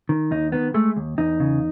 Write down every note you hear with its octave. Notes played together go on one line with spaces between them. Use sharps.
D#3
D#2 D#4
D#3 B3
G#3 A3
D#2
E2 D#4
C#3